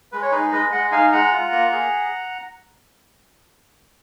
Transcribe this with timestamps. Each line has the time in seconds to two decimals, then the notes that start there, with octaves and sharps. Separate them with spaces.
0.12 G#3 B4
0.22 C#5
0.31 D#4 G#4 B4
0.52 G#3 B4 D#5
0.72 G#3 D#5 F#5
0.91 D#4 F5 G#5
1.12 G#3 F#5 A#5
1.32 F4
1.52 A#3
1.72 G#4